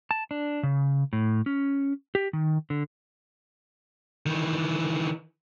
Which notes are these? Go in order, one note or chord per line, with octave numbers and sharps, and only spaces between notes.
A5
D4
C#3
A2
C#4
G4
D#3
D3
D#3 E3